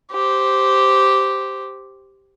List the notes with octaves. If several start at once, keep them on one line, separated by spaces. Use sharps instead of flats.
G4 C5